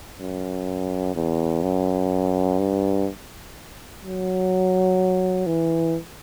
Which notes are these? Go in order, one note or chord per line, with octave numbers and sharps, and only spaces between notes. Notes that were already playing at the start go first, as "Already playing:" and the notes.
F#2
E2
F#2
G2
F#3
E3